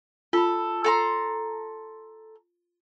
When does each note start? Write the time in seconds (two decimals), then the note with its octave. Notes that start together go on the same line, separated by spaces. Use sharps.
0.33 F4 A4 B5
0.84 A4 A#5 C6